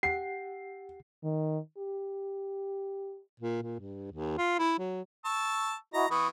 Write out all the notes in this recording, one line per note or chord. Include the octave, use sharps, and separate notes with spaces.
G4 F#5 C7
D#3
G4
A#2
A#2
G2
D#2
F4
E4
F#3
A5 C#6 E6
E4 F#4 D#5 A#5
E3 B3 B5 C#6 D#6